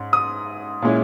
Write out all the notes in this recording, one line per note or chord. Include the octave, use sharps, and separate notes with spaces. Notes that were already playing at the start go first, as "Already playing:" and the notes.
Already playing: G#2 C#4
D#6
A#2 G#3 C#4 E4